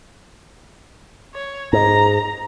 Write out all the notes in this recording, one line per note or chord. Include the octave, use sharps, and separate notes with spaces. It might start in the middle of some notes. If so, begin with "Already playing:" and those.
C#5
G#2 A#5